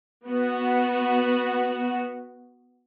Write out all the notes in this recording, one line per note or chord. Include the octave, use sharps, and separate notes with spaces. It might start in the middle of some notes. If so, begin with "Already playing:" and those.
B3 F#4